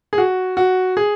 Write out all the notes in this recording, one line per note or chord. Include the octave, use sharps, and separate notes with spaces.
G#4
F#4
F#4
G#4